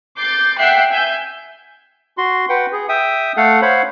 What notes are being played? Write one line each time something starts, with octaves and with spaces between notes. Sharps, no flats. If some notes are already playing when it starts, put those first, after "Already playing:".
D6 G6 A6 C7
E5 F#5 G5 F#6 C7
E5 G#5 G6
F#4 C6
B4 F#5 G5
G#4
E5 G5 D#6
A3 A4 F5 F#5
C5 C#5 F5 F#5 B5